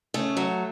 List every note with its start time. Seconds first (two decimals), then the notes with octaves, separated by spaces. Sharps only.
0.14 C#3 A3
0.37 F#3